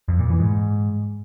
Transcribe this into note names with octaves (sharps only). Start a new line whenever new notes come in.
F2
A#2
E3
G#2